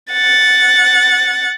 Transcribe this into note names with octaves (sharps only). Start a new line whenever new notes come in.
F#5 A6